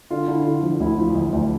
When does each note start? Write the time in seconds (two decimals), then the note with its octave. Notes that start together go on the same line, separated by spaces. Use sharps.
0.11 D3 F4
0.28 D3 E4
0.45 D3 F4
0.63 F3
0.80 D2 E4
0.98 F3
1.15 D2
1.32 D2